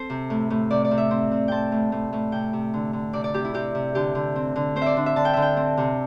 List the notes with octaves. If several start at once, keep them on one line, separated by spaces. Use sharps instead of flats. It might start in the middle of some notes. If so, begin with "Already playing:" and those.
Already playing: C4 A4 C5
C3
A2
A2
C3 D5
D5
C3
E5
C4
C3
C4 G5 A5
A2
A2
A2
C3 G5
C3
D3
D3
C3 D5
D5
C3 G4
E4
C3 G4
C3
D3 G4
D3
C4
D3
C4 C5
D5 E5
D3
E5
D3 A5
G5
D3 E5
G5
C4
C3